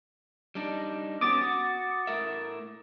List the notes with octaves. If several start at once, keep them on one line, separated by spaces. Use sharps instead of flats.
G3 D4 D#4
B3 C#4 F#4 D6 D#6 A6
F#4
A2 A#4 E5